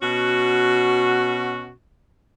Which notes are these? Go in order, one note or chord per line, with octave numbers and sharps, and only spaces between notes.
B2 C#4 F#4